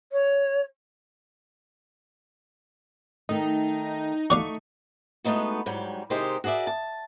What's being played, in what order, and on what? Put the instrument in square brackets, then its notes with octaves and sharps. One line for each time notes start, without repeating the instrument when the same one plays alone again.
[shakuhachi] C#5
[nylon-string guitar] D#3 A3 [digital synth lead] D#4
[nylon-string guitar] A3 D#4 [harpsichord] F#4 D5 F5 [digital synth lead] C#6
[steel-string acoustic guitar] G#3 A3 B3 C4 D#4 F#4
G#2 F#3 G3
C3 D#3 G#3 C4 D#4 G4
F#4 G#4 A#4 D5 E5
A5